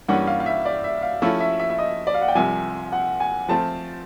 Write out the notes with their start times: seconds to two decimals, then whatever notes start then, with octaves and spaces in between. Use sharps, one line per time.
0.08 G2 E3 G3 A#3 C#4 F#5
0.27 F5
0.40 F5
0.46 E5
0.65 D5
0.84 E5
1.02 F5
1.22 F3 A3 C#4 E4 A4 F5
1.40 E5
1.60 E5
1.70 E5
1.78 D#5
2.07 D5
2.14 F5
2.21 F#5
2.28 G5
2.35 C2 C3 F3 G#5
2.92 F#5
3.20 G#5
3.48 F3 A3 C4 F4 A5